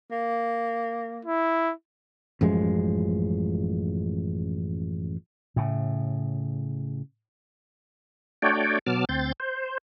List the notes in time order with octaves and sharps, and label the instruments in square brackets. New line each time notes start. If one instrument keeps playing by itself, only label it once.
[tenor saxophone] A#3
[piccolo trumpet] E4
[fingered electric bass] A1 F#2 F3 G#3
[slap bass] A2 C#3
[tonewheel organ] A3 D4 F#4 C#5 D5 G5
B2 F#3 B3 A5 D6 F6
D2 C4 C6 G6 A6
C5